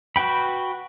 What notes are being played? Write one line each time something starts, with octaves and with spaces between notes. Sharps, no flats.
F#4 B4 G5 B5